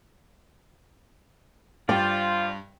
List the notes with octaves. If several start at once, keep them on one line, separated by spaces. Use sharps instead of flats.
G2 F4 C5 D5 G5